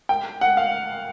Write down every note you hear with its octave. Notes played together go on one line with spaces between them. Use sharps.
G5
F#5
F5